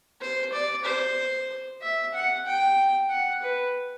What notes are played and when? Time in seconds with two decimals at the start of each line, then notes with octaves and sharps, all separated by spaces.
0.21 C5
0.52 D5
0.85 C5
1.82 E5
2.14 F#5
2.46 G5
3.10 F#5
3.42 B4